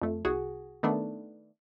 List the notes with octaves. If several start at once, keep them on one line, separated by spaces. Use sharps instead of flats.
F2 A3
C2 F#4 G#4
D#3 A3 B3 D4